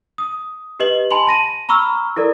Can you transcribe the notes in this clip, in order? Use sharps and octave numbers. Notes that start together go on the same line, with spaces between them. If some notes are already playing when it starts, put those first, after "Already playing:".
D#6
G4 B4 D#5 F#7
G#5 A5 B5 C6 F#7
A5 A#6 D#7
A#5 B5 C#6 E6 F6
E4 A4 A#4 D5